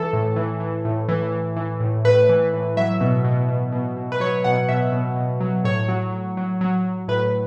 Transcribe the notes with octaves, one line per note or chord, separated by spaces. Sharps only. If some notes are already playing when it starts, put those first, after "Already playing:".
Already playing: E3 A4
A2
E3
E3
A2
E3
E3
E3
A2
A2 B4
E3
A2
F#3 E5
B2
B2
B2
B2
B2
B4
F#3 C#5
B2 F#5
B2 E5
B2
B2
F#3
A2 C#5
F#3
F#3
F#3
F#3
F#3
A2 B4